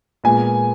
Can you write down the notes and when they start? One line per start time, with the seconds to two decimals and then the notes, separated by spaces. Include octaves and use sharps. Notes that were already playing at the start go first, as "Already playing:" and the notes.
0.24 A#2 G#3 B3 G#5